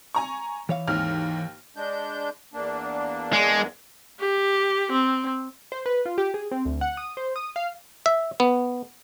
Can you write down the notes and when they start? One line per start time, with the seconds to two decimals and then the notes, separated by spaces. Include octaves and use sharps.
0.15 G#5 A#5 C#6
0.69 E3 C#5 F5
0.87 D#2 G#2 F6
1.77 G#3 D4 G6
2.54 E2 A#3 D4
3.33 G#3
4.20 G4
4.92 C4
5.72 C5
5.86 B4
6.06 F4
6.18 G4
6.34 G#4
6.52 C4
6.65 D2
6.81 F#5
6.97 D#6
7.17 C5
7.36 D#6
7.56 F5
8.06 E5
8.40 B3